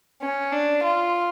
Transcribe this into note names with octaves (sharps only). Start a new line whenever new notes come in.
C#4
D4
F4